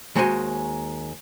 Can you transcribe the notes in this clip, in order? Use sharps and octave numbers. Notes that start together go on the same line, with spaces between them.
D#2 G#3 F#4 C5 F#5 G#5